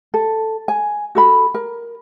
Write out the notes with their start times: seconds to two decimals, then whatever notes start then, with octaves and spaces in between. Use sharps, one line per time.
0.14 A4
0.68 G#5
1.15 F#4 A4 B5
1.54 A#4